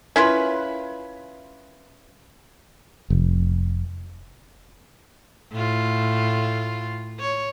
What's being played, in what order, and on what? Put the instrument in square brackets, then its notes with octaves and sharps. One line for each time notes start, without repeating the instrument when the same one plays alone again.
[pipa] C#4 E4 F4 B4
[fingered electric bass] F1
[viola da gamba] A2 F4
C#5